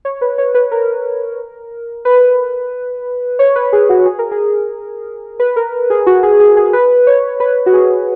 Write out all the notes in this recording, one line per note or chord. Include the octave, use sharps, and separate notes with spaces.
C#5
B4
C#5
B4
A#4
B4
C#5
B4
G#4
F#4
G#4
A#4
G#4
B4
A#4
G#4
F#4
G#4
G#4
G#4
B4
C#5
B4
F#4
G#4